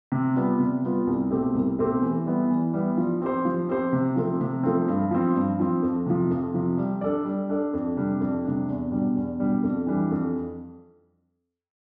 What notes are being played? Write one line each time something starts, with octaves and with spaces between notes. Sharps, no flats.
C3
G3 B3 F4
C3
G3 B3 F4
C2
B2 A3 C4 G4
C2
B2 A3 C4 G4
E3
G3 B3 E4
E3
G3 B3 E4
F3
C4 G4 C5
F3
C4 G4 C5
C3
F3 A3 C4
C3
F3 A3 C4
G2
F3 C4
G2
F3 C4
F2
C3 F3
F2
C3 F3
G3
D4 A4 D5
G3
D4 A4 D5
F2
C3 G3 D4
F2
C3 G3 D4
E2
B2 G3 D4
E2
B2 G3 D4
F2
E3 G3 D4
F2